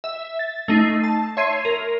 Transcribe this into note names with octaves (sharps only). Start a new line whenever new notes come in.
E5
A6
A3 D#4 C7
A5
C#5 E5 C6 G#6 C7 D#7
A#4